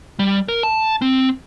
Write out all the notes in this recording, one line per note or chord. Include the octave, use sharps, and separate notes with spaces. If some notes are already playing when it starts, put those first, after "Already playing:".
G3
A#4
A5
C4